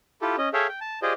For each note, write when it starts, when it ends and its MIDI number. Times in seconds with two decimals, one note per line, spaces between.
0.22 0.36 64
0.22 0.36 65
0.22 0.36 67
0.22 0.36 69
0.38 0.49 61
0.38 0.49 75
0.53 0.67 68
0.53 0.67 69
0.53 0.67 73
0.53 0.67 76
0.53 0.67 77
0.53 0.67 79
0.69 0.80 79
0.81 1.00 81
1.02 1.13 65
1.02 1.13 67
1.02 1.13 68
1.02 1.13 72
1.02 1.13 74
1.02 1.13 75